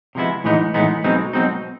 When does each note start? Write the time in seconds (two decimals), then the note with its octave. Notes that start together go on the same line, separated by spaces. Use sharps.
0.15 C3 F3 G#3 B3 E4
0.44 A2 E3 G#3 B3 D#4
0.74 A2 E3 G#3 B3 D#4
1.04 B1 B2 G#3 C4 D#4
1.33 B1 B2 G#3 C4 D#4